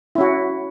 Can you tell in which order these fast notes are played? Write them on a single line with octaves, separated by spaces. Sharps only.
E4 C#4 F#4